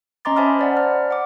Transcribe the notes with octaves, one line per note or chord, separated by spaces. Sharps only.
C#4 D#5 A#5 C6 D6 A6
C5 E5 G#5 A5 B5 F6
C5 D5 F#5
F6
F#5 D6